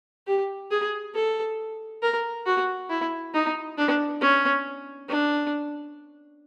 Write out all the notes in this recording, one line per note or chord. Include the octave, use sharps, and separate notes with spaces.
G4
G#4
A4
A#4
F#4
E4
D#4
D4
C#4
D4